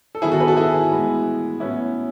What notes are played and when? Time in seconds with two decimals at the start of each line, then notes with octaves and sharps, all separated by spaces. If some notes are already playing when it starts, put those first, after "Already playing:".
0.15 A4
0.22 D#3 F#3 B3 E4 G#4
0.32 F#4 A4
0.40 G#4 B4
0.48 F#4 A4
0.57 E4 G#4
0.92 A2 E3 G#3 B3
1.60 A2 F#3 B3 C#4 E4